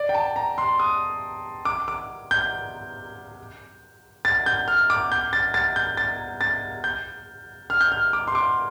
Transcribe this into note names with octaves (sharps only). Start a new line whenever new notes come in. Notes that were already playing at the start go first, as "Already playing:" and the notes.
Already playing: D5
G5
A5
A#5
C6
D#6
D6
D6
G6
A6
G6
F6
D6
G6
A6
A6
G6
A6
A6
G6
F6
G6
F6
D6
C6
D6